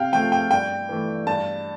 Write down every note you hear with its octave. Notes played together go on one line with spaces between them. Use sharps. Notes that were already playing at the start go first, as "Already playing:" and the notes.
Already playing: C3 F5 G5
F3 A3 G5
G5
G2 G5
E3 A3
G2 A5